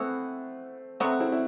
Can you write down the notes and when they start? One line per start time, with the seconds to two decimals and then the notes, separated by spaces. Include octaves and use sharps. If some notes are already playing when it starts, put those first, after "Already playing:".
Already playing: E3 A3 B3 C4 F#4
1.00 C3 F#3 A3 B3 C4 F#4
1.20 C4 E4
1.32 E4